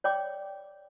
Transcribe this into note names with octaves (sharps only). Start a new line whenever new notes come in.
C#5 D5 G5 D6